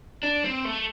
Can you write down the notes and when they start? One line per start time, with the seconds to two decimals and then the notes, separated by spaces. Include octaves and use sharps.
0.23 D4
0.44 C4
0.65 A3